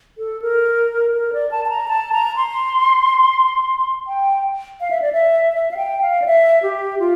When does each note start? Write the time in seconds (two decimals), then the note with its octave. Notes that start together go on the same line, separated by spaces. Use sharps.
0.18 A4
0.42 A#4
1.14 A#4
1.33 D5
1.51 A5
1.65 A5
1.70 A#5
1.88 A5
2.12 A#5
2.36 C6
4.07 G5
4.81 F5
4.91 E5
5.02 D5
5.12 E5
5.53 E5
5.71 F5
5.77 G5
6.02 F5
6.22 D5
6.26 E5
6.63 G4
6.99 F4